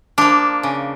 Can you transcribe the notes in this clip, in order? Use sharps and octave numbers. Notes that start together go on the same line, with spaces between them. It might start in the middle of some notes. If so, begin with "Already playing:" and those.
F3 A#3 D4
C#3